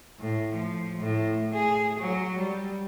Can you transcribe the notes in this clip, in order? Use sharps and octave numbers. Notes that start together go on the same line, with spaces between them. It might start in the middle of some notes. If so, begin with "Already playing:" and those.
A2
F3
A2
G#4
F#3
G3